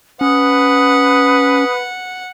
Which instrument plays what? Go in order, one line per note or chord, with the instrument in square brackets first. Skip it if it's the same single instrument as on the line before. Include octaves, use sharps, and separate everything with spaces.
[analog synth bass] C#4 [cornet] B4 [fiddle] F#5 [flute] D#6